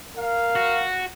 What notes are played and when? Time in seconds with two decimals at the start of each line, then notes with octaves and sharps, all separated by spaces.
0.17 A#4 F5
0.55 F#4